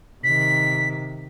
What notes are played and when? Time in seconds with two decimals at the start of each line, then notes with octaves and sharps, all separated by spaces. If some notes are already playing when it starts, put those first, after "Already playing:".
0.24 C3 D#3 B6